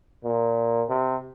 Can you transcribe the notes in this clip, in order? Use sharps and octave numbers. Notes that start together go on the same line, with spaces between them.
A#2
C3